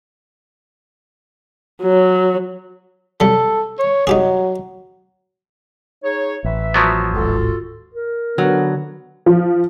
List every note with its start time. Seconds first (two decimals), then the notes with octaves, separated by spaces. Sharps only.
1.82 F#3
3.20 F#3 G3 A4
3.79 C#5
4.07 F#3 D#4 G4 G#4
6.04 D#4 G#4 C#5
6.44 A1 B4 E5
6.74 F3 F#3 B3
7.13 D1 G#1 G#2 F4 F#4 A4
7.94 A#4
8.38 D3 F#3 B3
9.26 F3